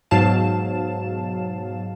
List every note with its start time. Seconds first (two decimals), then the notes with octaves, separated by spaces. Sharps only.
0.11 G#2 B2 F#3 F5 A5 E7